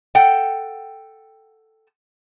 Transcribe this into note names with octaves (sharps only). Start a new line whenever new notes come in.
A4 F#5 G5